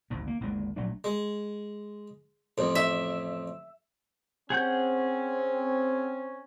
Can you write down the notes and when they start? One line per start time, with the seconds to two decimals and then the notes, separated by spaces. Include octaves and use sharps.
0.10 G#1 D2 G#2
0.27 A#3
0.40 G#1 D#2 D3 G#3
0.76 A#1 F#3 A3 D4
1.04 G#3
2.58 A1 F2
2.75 E5
4.50 C4 C#4 G#4 F#5 G6